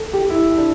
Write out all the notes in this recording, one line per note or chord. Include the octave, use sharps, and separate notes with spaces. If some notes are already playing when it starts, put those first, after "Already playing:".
Already playing: A4
G4
E4
D4